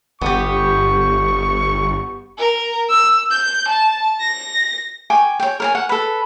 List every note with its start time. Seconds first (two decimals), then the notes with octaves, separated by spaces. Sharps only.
0.21 G1 B3 G4 C#6
2.38 A#4
2.89 E6
3.30 G6
3.68 A5
4.19 A#6
5.10 G5 G#5 C#6 D6
5.40 C#5 G5
5.60 A#4 C#5 G#5
5.75 F#5
5.89 A4 B4